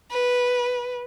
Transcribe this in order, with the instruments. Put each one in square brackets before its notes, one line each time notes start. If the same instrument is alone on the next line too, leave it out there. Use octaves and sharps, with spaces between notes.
[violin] B4